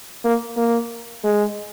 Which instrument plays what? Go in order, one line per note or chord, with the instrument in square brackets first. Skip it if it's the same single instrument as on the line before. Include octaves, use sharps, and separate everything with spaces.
[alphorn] A#3
A#3
G#3